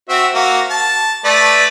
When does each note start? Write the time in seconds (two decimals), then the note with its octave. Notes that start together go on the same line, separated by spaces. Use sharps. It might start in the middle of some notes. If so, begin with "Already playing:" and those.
0.09 C4 F#4 E5
0.35 A#3 F#4
0.70 A5
1.25 A3 B4 D5